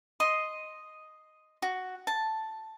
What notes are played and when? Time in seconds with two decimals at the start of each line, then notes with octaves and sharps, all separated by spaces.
0.20 D#5 C6
1.62 F#4
2.07 A5